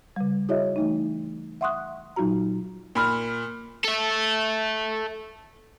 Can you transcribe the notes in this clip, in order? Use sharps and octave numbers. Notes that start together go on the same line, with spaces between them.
C#3 G3
E4 F#4 G#4 C#5 D#5 E5
E3 A3 D#4
E5 F#5 C6 C#6 D#6 F#6
A#2 F#3 D#4 F4 F#4 A#5
A#2 B5 F6
A4 E5